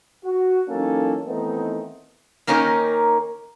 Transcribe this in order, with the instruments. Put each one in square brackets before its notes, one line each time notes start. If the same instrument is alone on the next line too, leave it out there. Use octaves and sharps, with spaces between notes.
[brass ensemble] F#4
E3 F#3 A#3 C#4 D#4 A4
D#3 E3 A3 B3 C4 D#4
[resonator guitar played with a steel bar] D#3 A#3 C#4 D#4 A#4